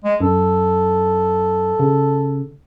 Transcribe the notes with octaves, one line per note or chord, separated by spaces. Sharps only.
G#3
F#2 A4
C#3